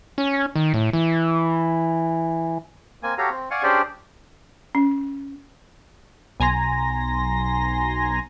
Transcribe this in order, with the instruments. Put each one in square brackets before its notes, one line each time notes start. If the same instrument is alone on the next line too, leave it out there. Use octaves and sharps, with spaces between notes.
[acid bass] C#4
D#3
A2
E3
[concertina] A#3 C4 G#5
F#4 G4 A4 C#5 F5 A#5
C4
D5 F5 F#5 G#5 C#6
C#4 D4 G4 G#4 C5 D5
[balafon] C#4
[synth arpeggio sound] B1 G#5 A#5 C6 A#6